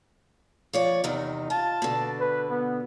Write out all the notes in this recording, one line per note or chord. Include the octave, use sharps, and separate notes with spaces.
F3 C#5 D5
E2 C3 D#3 D#4
F4 A5
B2 D3
B4
B3